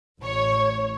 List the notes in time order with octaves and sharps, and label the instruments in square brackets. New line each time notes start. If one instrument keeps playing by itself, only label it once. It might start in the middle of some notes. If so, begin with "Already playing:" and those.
[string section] A1 C#5